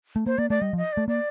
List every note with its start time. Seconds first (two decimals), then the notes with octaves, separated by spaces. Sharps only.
0.16 A3
0.26 A#3 C5
0.38 A#3 D5
0.50 A3 D5
0.62 G3 D#5
0.73 F3
0.78 D#5
0.93 A3 D5
1.08 A#3 D5